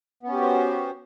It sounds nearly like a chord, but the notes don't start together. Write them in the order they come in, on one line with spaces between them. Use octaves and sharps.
B3 C#4 G4 F#4 C5